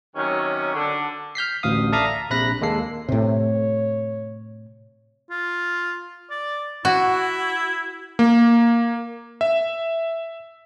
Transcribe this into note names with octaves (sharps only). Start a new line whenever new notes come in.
C3 D#3 F#3 C#4
D3
F6 G6 B6 C7
A1 D2 F5 D#6
A4 D5 E5 F5 A#5 D#6
A#5
A#1 C3 B5 F#6 A#6
D#2 G#3 A#3 A4 C7
A2 C3 C#5
F4
D5
E4 F#4
A#3
E5